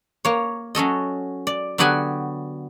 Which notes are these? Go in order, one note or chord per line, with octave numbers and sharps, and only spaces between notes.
A#3 C#5
F#3 C#4 A4 D#5
D5
D3 F#3 B3 G4 F#5 G#5